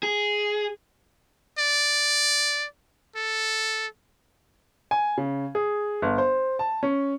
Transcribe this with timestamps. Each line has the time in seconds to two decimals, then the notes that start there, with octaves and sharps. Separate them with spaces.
0.03 G#4
1.59 D5
3.16 A4
4.91 G#5
5.18 C#3
5.55 G#4
6.02 G1
6.18 C5
6.59 A5
6.83 C#4